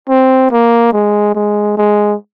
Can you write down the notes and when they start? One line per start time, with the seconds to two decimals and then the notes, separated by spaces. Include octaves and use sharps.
0.09 C4
0.51 A#3
0.93 G#3
1.35 G#3
1.77 G#3